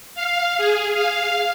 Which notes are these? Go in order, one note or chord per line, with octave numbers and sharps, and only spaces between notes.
F5
G#4
F5